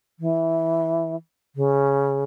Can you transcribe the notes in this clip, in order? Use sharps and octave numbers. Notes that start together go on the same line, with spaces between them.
E3
C#3